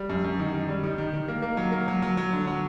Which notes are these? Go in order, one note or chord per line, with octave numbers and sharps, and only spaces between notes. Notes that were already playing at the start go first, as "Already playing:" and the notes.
Already playing: G3
F#2
F#2
D#3
D#3
G3
D#3
D#3
D#3
A#3
A#3
F#3
A#3
F#3
F#3
F#3
D3
F#3